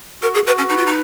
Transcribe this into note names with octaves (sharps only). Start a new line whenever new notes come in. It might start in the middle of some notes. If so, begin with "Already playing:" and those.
F#4 A#4
G#4
F#4 B4
C#4
D#4 B4
F4
D#4